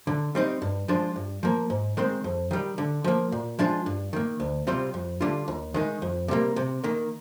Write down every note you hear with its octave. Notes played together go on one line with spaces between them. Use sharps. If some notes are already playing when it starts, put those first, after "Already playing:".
D3
G3 C4 D#4
G2
F3 G#3 D4 F4
G2
F3 A#3
G#2
D#3 G#3 C4
F2
D#3 G3
D3
F3 A#3
A#2
F3 G#3 D4 F4
G2
D#3 A#3
D2
C3 G3 C4 F4
F2
D3 G3 D4 F4
D#2
D#3 G#3 D#4
F2
C3 G3 A#3
C3
D#3 A#3